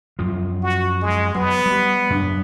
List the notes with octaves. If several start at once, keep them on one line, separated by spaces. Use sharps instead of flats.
F#2 F3
F#4
G#3
F#3 B3
G3
F#2 D4